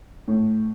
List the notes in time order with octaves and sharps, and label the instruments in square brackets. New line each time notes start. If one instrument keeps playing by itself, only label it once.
[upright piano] A2